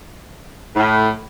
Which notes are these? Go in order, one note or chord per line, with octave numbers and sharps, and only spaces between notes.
A2